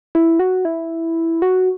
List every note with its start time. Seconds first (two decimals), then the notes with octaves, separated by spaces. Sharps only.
0.15 E4
0.39 F#4
0.65 E4
1.42 F#4